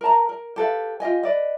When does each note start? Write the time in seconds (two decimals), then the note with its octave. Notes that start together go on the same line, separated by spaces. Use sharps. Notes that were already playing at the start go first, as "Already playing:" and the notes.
0.01 A#4 B4 A5 A#5
0.29 A#4
0.56 G4 A4 B4 F5
1.00 F4 G4 D#5 G#5
1.23 B4 D5 D#5